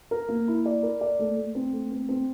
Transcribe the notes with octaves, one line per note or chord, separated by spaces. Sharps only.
A#4
A#3
E4
D5
A#4
D5
A3
A3
C4
A3
C4
C4